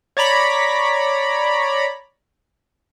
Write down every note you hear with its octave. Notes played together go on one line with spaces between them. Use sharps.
C#5 D5 A#5 B5